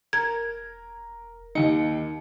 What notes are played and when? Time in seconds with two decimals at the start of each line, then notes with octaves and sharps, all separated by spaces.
0.13 E1 A#4 G#6
1.55 D#2 D#4 C#7